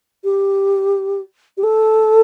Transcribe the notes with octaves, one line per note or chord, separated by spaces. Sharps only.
G4
G4
A4